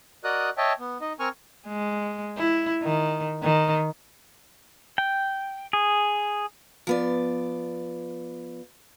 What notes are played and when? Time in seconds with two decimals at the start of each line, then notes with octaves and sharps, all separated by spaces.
0.24 F#4 A#4 D5 D#5 D#6 F#6
0.57 C#5 D#5 E5 G5 A5
0.79 B3
1.01 D#4 D#5
1.20 C4 A#4 G#5 C#6 F6
1.67 G#3
2.37 E4
2.84 D#3
3.42 D#3
4.98 G5
5.73 G#4
6.87 F3 B3 D5